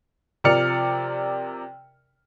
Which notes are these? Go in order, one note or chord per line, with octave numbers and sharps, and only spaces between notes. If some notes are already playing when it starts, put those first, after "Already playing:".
C3 F3 A#4 D5 F6 C#7